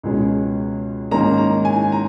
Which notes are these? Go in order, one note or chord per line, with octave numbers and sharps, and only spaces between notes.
C#2 B2 G#3 C#4
G#2 D#3 A#3 C#4 A#5
A#5
G#5
A#5